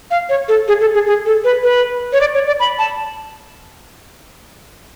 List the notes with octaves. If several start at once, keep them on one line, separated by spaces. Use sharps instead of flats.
F5
C#5
A4
G#4
A4
G#4
G#4
A4
B4
B4
C#5
D5
C#5
D5
B5
A5